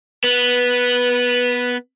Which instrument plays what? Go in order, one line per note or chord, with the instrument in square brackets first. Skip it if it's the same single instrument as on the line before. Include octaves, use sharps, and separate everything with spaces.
[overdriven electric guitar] B3 [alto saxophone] B4